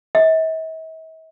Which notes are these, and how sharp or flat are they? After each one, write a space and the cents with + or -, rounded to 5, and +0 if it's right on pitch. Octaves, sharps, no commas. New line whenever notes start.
E5 -45